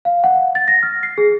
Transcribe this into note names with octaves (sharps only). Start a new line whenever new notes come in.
F5
F#5
A6
A#6
F6
C7
G#4